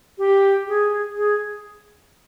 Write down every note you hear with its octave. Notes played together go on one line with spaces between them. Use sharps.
G4
G#4
G#4